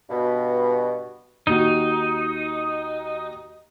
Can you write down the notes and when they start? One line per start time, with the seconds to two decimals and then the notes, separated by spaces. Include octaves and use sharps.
0.10 G2 B2
1.47 D#2 D#4 F#4